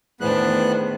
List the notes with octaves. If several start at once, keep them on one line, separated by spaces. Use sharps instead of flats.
E2 A2 D#3 B3 D4 C5 F#6